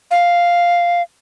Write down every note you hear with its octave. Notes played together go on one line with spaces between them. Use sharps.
F5